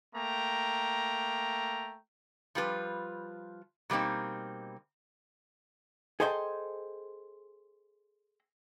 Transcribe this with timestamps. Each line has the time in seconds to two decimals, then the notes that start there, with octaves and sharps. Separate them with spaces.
0.15 A3 A#3 G5 A#5
2.55 F3 G3 F4 B4
3.90 B2 G3 A#3 C4 D#4
6.20 G#4 A4 C5 D#5 F5 G5